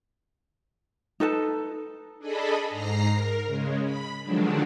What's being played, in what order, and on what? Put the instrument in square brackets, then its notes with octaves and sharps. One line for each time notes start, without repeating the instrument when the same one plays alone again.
[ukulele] D#4 A4 B4 A5
[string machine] D4 G#4 A4 D#5 B5
G#2 A#5 A#6 C7
A#4
C#3 G#3
B5
D3 D#3 F3 F#3 G#3 D4